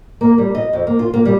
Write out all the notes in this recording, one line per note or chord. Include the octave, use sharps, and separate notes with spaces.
A#3
G3
D#5
F2
A#3
F4
A#3
G3